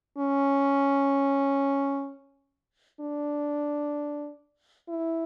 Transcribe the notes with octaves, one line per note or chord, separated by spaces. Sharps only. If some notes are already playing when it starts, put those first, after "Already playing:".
C#4
D4
E4